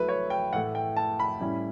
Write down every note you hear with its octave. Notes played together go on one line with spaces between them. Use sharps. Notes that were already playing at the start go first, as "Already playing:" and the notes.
Already playing: F#3 A3 E4 B4
C#5
G5
A2 E3 A3 F#5
G5
A5
B5
A2 G3 C#4 E4